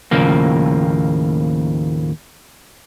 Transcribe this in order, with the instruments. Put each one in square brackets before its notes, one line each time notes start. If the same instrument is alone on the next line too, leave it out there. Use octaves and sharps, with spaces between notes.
[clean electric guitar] D#2 A2 C#3 F3 A#3